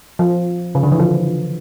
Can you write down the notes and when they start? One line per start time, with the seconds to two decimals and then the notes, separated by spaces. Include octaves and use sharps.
0.19 F3
0.75 C#3
0.83 D3
0.92 E3
0.99 F3